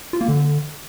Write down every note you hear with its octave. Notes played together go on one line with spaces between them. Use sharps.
F4
A#3
D3